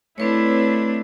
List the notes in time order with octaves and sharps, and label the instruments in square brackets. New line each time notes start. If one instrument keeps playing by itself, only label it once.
[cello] A3 D4 [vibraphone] C4 B4 C#5 [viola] E4